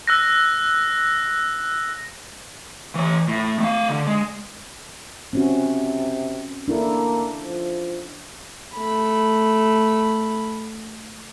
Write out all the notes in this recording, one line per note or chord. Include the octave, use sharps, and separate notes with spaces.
E6 F#6 A#6
E3 C#5
A2
A3 F5
D3
G#3
C3 C4 C#4 F#4
A#3 D4 E4 A4
F3
A3 B5